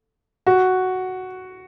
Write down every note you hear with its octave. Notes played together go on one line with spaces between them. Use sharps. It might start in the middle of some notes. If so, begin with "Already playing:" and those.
F#4